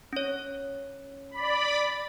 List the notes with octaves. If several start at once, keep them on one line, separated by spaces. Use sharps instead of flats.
C#4 C#5
D5 B5